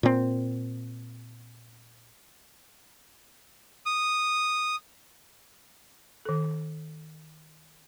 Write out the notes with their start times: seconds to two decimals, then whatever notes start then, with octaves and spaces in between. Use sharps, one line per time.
0.03 A#2 C4
3.86 D#6
6.25 D#3 A4